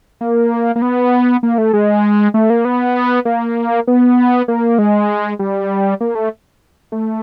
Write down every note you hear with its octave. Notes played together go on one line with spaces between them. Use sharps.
A#3
A#3
B3
A#3
A3
G#3
A3
A#3
B3
A#3
B3
A#3
G#3
G3
A#3
A3
A3